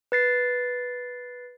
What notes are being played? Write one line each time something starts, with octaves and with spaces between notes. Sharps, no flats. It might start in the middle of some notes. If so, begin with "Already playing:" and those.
B4 A6 C7